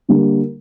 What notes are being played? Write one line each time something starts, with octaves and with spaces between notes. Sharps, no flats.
D3 G3 A#3